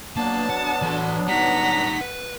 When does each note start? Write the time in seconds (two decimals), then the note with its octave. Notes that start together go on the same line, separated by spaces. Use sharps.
0.16 F#3 A#3 B3 D4 A5
0.50 F#5
0.82 E3 A4
1.28 G3 D#4 F#5 A#5 B6
2.01 B4